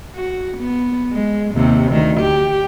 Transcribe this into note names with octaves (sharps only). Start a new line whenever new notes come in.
F#4
B3
G#3
D#2 C3
D2 D#3
G4